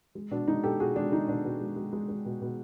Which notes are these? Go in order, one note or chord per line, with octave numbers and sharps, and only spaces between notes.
G#3
B2 D4
G#3 D#4
B2 G4 A4
B2 F#4 G#4
G#3 D4
G#3 D#4
B2 D4
B2
G#3
G#3
G#3
G#3
B2
B2